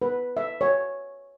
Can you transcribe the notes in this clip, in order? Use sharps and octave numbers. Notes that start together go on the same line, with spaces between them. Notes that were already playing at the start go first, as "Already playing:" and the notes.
B4
E5
C#5